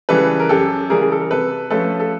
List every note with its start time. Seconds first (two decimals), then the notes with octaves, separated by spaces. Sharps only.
0.09 C#3 E3 G3 A4 B4
0.40 A#4
0.49 F#2 G4 A4
0.90 C#3 E3 G3 G#4 A#4
1.01 G#4
1.12 A4
1.21 A#4
1.31 C3 A4 B4
1.70 F3 A3 C#4 A4 B4
2.00 A4